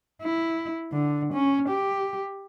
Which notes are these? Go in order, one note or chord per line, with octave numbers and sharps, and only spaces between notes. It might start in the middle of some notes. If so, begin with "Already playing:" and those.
E4
D3
C#4
G4